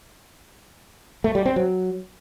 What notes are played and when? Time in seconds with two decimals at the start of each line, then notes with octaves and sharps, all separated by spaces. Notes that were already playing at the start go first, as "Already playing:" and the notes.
1.24 A3
1.35 G3
1.46 C4
1.56 F#3